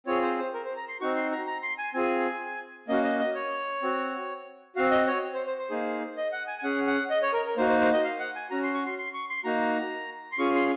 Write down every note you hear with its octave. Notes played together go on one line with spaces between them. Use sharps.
C4 F4 G#4 C#5
C5
C5
A#4
C5
A#5
C6
C4 D#4 F#4 C#6
C6
A#5
A#5
C6
G#5
C4 F4 G#4 G#5
A#3 C#4 F#4 D#5
D#5
D#5
C#5
C4 F#4
C4 F#4 F5
D#5
C#5
C5
C5
C5
A#3 D#4 G#4
D#5
F#5
G#5
G#5
C#4 G#4 F#5
F#5
D#5
C#5
A#4
A#4
A#3 D#4 F#4 C5
C5
C5
D#5
F5
F#5
G#5
C#4 F#4 A#5
C6
C#6
C6
C6
C#6
C6
A#3 D#4 F#4 A#5
C6
C#4 F4 G#4 C#6
C6